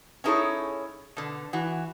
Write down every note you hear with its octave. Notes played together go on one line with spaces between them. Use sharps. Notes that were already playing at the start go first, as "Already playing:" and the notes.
C#4 D#4 E4 G#4 A4 C#5
B2 D3
E3 F#4